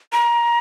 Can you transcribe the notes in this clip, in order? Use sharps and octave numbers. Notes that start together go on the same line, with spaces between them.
A#5